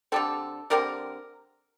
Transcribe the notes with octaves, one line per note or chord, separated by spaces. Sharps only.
D3 G3 C4 A4
D3 G3 C4 A#4